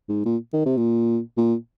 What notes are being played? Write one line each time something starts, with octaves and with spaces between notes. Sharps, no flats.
G#2
A#2
D#3
C3
A#2
A#2